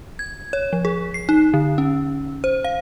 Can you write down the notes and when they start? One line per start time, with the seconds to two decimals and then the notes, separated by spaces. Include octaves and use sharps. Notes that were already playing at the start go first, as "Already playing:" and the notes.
0.19 G#6
0.53 C#5
0.73 F3
0.85 G#4
1.14 C7
1.29 D#4
1.54 D3
1.78 C#4
2.44 C5
2.64 F5